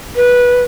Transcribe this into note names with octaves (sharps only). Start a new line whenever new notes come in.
B4